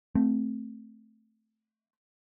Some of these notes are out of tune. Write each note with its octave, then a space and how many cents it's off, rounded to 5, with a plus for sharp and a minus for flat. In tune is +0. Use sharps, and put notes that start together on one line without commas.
A3 +0 C4 +0